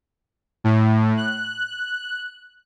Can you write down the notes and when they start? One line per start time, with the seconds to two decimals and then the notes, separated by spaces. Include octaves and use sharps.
0.64 A2
1.17 F#6